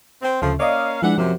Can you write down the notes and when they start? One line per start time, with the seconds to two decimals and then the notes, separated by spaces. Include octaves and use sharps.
0.22 C4
0.42 D2 C#3 F3 A3
0.60 A#3 C#4 D5 D#5 F5
1.02 E3 F3 G#3 D4 F#5
1.18 F#2 C3 F3